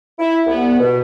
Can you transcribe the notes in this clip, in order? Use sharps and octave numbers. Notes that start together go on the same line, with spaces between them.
E4
C2 B3
B2